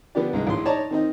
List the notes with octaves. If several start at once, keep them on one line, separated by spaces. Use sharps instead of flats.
D3 F3 B3 D4 G4 D5
C2 G2 G#3
A#1 A2 C6
D#4 C#5 D5 A5 A#5
D#3 C4 D#4